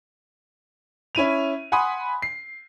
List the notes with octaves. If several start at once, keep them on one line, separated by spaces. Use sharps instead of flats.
C#4 E4 D#7 F7
F#5 G#5 B5 C6 D#6
C7